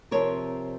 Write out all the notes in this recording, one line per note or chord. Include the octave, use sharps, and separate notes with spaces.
C3 F3 C4 A#4 C#5